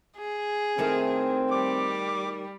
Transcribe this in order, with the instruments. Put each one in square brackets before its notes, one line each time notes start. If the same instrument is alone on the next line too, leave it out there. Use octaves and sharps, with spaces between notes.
[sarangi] G#4
[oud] D#3 A3 E4 [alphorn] C4
[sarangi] G3 [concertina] D6